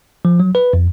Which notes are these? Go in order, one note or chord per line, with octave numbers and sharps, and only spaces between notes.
F3
F#3
B4
F2